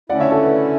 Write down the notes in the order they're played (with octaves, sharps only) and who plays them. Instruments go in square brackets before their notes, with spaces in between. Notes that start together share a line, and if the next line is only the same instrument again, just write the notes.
[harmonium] D3 A3 C#4 E4 [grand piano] D5 F#5
[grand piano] C#5 E5
A4 C#5
B4